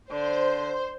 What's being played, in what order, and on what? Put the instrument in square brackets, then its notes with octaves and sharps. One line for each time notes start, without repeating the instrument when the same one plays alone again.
[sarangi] D3 [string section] C5